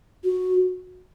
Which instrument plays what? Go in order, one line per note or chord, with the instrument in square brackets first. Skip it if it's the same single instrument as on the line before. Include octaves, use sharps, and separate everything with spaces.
[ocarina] F#4